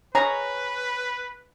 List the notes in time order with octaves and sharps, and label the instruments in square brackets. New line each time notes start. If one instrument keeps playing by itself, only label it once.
[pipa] G#4 C#5 [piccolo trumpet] B4 [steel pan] A#5